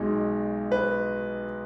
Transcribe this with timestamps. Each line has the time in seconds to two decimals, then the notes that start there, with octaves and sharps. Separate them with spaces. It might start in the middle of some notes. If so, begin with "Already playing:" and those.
Already playing: B1 B2 G#3 D#4
0.72 B4